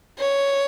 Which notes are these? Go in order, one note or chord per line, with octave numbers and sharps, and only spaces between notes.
C#5